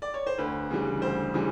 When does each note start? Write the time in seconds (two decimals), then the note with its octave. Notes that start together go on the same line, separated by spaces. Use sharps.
0.02 D5
0.14 C#5
0.26 C5
0.38 D2 B4
0.70 C#3 E3 G3
1.02 D2 C5
1.34 C#3 E3 G3